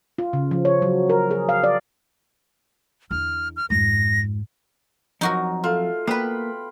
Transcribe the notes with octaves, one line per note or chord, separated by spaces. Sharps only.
F4
C#3
F3
C#5
F#3
A#4
G#4
F5
D5
E2 D3 F6
F6
F2 G#2 A#6
F2 F3 F#3 D#4 F#4 A#4
A3 F4
A#3 B3 B4 G5 B5